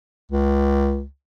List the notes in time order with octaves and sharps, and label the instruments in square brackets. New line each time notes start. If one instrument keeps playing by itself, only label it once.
[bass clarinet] C#2